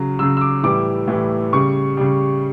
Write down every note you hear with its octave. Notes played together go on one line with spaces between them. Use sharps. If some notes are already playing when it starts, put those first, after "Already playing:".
Already playing: C#3 F#3
C#3 F#3 E6
E6
D6
A2 E3 G3 D6
A2 E3 G3
C#3 G3 C#6
C#3 G3